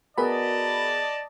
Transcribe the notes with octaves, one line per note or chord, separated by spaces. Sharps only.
B3 F#4 G#4 A#4 D5 D#5 A5 B5